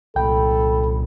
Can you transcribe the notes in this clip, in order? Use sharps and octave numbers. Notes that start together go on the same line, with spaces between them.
C2 A#2 A4 G5 B5